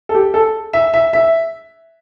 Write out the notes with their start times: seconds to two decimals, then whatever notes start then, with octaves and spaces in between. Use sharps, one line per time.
0.09 A4
0.15 G4
0.34 A4
0.73 E5
0.94 E5
1.13 E5